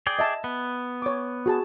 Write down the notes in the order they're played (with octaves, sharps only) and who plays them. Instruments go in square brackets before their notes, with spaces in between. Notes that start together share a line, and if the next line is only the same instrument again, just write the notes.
[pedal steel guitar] G#4 D5 G5
[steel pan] D#5 E5 A5
[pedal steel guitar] B3
[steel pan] C#5 D6
F#4 G#4 A5